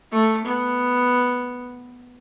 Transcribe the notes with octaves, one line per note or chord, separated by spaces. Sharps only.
A3
B3